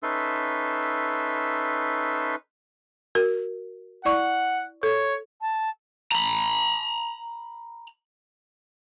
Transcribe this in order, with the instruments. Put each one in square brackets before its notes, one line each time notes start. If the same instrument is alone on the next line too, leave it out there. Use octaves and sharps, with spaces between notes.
[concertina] C#4 D#4 A4 B4 E5 C6
[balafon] F#4 A#4
[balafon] E4 D5 C#6 [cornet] F#5
[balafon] A4 [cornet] C#5
[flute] A5
[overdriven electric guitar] A#5 B5